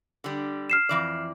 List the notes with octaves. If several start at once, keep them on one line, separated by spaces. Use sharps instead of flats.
D3 G3
F6 C7 E7
F2 E3 D5